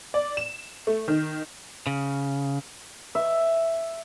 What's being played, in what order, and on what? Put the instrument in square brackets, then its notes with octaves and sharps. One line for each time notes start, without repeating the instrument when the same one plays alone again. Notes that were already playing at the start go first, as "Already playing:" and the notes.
[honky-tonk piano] D5
E7
A3
D#3
[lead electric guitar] C#3
[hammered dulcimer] E5